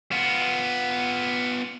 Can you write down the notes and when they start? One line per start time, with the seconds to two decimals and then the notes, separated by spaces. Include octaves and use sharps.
0.12 B3 F4